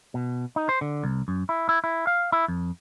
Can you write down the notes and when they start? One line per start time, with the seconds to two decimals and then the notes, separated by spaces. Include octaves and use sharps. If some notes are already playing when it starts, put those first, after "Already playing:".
0.14 B2
0.56 D#4
0.69 C5
0.81 D3
1.04 C2
1.28 F#2
1.49 E4
1.69 E4
1.84 E4
2.07 F5
2.32 E4
2.48 F2